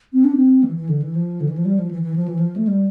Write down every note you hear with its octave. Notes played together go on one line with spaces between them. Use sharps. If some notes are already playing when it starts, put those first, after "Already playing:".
C4
D4
C4
E3
E3
D3
E3
F3
D3
E3
F3
G3
F3
E3
E3
F3
E3
F3
A3
G3